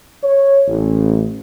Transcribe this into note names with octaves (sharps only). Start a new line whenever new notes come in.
C#5
A1